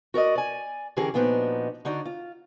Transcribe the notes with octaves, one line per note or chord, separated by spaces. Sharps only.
F#4 A#4 D5 D#5
D5 G#5
D3 E3 C#4 G4 G#4 A#4
A#2 F3 B3 D4 D#4 F#4
D3 D#4 F#4 C#5 D5
F4